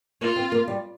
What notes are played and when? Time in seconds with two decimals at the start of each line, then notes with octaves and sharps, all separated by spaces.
0.21 A#3 F4
0.36 C4
0.52 A#3
0.68 G3